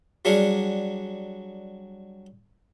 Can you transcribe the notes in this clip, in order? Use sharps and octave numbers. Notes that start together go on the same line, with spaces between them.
F#3 G3 D4 G#4 F5 F#5